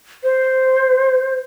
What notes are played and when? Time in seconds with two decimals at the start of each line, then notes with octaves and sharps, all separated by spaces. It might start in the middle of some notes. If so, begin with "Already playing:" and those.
0.24 C5